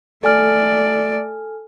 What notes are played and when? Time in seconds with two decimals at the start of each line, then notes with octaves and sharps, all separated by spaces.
0.24 A3 A4 D5 G#5 F6